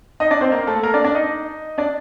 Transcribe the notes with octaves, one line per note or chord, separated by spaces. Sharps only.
D#4 D#5
D4 D5
C4 C5
A#3 A#4
A3 A4
A#3 A#4
D4 D5
D4 D5
D#4 D#5
D4 D5